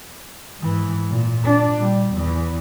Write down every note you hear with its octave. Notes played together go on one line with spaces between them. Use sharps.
G#2 E3
A#2
D4
A#2 G3
E2 E3